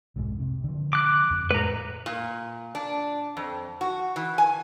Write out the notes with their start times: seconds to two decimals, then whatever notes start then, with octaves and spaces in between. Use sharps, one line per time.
0.16 B1 F2 G#2
0.40 C3
0.64 D3 F3
0.93 D6 F#6
1.30 F2
1.51 A2 G#3 B4 A#5
2.06 A#2
2.75 D4
3.37 F2
3.81 F#4
4.16 E3
4.38 G#5